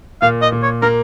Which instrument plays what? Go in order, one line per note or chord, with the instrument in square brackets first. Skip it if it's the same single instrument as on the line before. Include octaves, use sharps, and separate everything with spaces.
[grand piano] A#2 [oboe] F5
[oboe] D#5
[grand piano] A#2
[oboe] C#5
[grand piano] A#3 [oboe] A#4